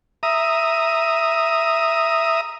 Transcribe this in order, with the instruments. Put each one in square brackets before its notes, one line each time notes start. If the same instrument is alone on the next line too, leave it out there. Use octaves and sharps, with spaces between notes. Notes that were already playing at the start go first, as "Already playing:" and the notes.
[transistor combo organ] E5 A#5 D#6